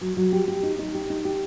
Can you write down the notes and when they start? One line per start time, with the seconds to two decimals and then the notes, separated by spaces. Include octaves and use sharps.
0.01 F#3
0.17 F#3
0.32 G4
0.48 G4
0.63 D#4
0.79 D#4
0.95 G4
1.10 D#4
1.25 G4